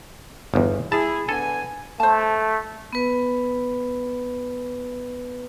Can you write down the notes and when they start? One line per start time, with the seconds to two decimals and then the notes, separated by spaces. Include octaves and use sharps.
0.54 G1 E2
0.92 E4 G#4 A5
1.29 D3 B3 A4 G#5
2.00 A3 C5 A5
2.93 B3 B4